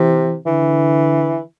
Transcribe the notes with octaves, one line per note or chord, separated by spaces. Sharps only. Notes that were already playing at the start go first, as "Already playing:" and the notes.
Already playing: C3 E3
D3 E3